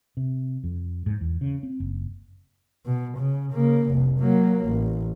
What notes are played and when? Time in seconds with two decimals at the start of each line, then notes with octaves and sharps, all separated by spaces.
0.17 C3
0.64 F2
1.06 G#2
1.21 E2
1.41 C#3
1.63 C4
1.80 F#1
2.85 B2
3.17 C#3
3.52 C#3 A#3
3.91 F1 C2
4.19 F#3 A#3
4.66 A1